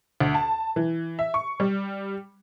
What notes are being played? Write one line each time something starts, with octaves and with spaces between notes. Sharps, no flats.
D2
A5
E3
E5
C#6
G3